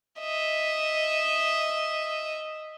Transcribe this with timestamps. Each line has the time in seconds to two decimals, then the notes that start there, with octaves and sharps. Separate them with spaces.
0.20 D#5 E5